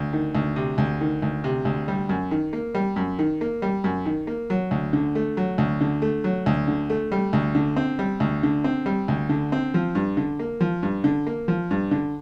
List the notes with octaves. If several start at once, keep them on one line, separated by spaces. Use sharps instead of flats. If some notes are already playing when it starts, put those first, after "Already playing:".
Already playing: D2
D#3
D2
C3
D2
D#3
D2
C3
D2
G3
F#2
D#3
A#3
G3
F#2
D#3
A#3
G3
F#2
D#3
A#3
F#3
D2
D3
A3
F#3
D2
D3
A3
F#3
D2
D3
A3
G3
D2
D3
C4
G3
D2
D3
C4
G3
D2
D3
C4
F3
G2
D3
A#3
F3
G2
D3
A#3
F3
G2
D3